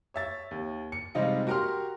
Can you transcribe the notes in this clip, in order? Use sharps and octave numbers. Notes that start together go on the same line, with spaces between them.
C#5 E5 A6
D#2
C#7
C3 G3 G#3 D#4 F4
F#4 G4 A#4 A#5 C6 F6